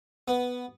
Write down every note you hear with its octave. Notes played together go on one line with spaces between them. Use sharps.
B3